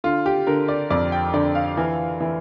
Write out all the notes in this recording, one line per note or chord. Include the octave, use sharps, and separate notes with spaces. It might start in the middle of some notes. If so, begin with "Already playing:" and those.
D3 F4
G4
D3 A#4
D5
F2 D5
G5
D3 D5
F5
E3
E3